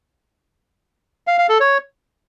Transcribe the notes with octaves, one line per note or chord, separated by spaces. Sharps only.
F5
F5
A4
C#5